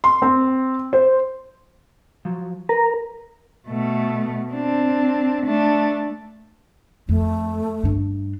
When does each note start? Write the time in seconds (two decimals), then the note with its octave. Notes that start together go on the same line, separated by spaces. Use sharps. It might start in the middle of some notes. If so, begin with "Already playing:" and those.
0.04 C6
0.22 C4
0.93 C5
2.25 F3 F#3
2.69 A#4 B4 A#5
3.68 B2 A3
4.52 C4 D4
5.46 A3 D4
7.09 F2 A3
7.83 G2 D4